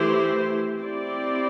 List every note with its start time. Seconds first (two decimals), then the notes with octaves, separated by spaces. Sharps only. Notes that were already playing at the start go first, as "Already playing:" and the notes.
Already playing: E3 A3 E4 G4 C5
0.82 C4 E4 G4 D5